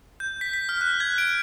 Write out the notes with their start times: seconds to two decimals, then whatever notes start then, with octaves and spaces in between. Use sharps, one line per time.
0.20 G6
0.41 B6
0.54 B6
0.69 F6
0.81 F#6
1.00 G#6
1.18 D7